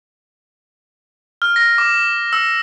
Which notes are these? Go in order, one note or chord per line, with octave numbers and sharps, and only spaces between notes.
F6
A#6
D6
E6